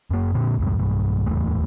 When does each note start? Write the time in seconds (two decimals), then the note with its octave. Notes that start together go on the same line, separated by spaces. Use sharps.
0.11 F#2 A#3
0.34 A#2 D3 C4
0.59 C2 F2 G#2
0.78 B1 G2
1.26 D1 G#1 E2 A3